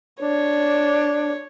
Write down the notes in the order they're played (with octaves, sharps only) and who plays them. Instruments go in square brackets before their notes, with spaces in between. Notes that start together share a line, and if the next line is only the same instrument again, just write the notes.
[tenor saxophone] D4 [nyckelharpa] C#5